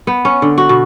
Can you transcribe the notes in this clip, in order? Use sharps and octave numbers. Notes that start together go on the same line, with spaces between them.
B3
C#4
D3
F#4
B2